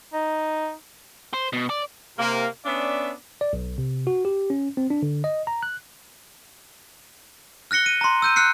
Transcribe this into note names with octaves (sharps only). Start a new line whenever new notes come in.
D#4
C5
B2
D5
C3 A#3
B3 C#4 D4 D5 E5
D5
B1
C3
F#4
G4
C#4
C4
D4
D3
D#5
A#5
F#6
F6 F#6 A#6 C#7 G7
D#7
A#5 C6
E6 G6 D#7
F6 F#6 C7 C#7